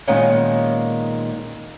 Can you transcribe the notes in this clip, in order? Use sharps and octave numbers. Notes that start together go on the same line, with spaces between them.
A#2 D#3 G#3 A#3 B3 C#4